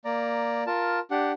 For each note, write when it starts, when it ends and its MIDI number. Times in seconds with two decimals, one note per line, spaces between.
0.05 0.64 58
0.05 0.64 74
0.05 0.64 82
0.67 0.99 65
0.67 0.99 70
0.67 0.99 81
1.11 1.32 62
1.11 1.32 67
1.11 1.32 78